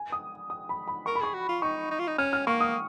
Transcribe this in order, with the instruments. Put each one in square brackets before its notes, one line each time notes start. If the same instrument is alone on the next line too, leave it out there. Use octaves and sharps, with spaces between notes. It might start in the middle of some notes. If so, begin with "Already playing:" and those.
Already playing: [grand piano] G#5
D#6
D#6
B5
B5
[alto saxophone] A#4 [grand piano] C#6
[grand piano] B5
[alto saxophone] G#4 [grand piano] C#6
[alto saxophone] F#4
F4
[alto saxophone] D#4 [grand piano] C#6
[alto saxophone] D#4
F4
D#4
[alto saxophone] C#4 [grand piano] F6
[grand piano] F6
[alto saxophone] A#3 [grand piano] C#6
[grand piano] D#6